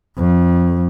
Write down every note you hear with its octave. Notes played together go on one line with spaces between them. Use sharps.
F2